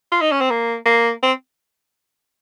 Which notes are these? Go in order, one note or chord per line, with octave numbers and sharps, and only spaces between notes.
F4
D#4
C#4
C4
A#3
A#3
C4